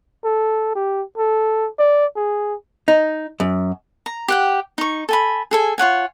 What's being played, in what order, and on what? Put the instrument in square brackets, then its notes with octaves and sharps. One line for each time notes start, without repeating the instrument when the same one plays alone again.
[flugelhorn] A4
G4
A4
D5
G#4
[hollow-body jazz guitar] D#4
F#2
[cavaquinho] A#5
G4 F#5 G5
D#4 C#6
A4 G#5 B5
G#4 A4 G#5
F4 C#5 F#5 G#5